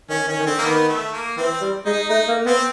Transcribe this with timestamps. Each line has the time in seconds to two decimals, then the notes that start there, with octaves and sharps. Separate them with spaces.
0.10 D#3 C#4
0.27 D#3 C#4
0.39 D#3
0.46 D3 C4
0.58 A#3
0.64 D#3 B3
0.88 A3
1.13 A#3
1.37 E3 C4
1.61 G3
1.85 G#3 D#4
2.09 A3 D#4
2.28 A#3
2.45 B3 C4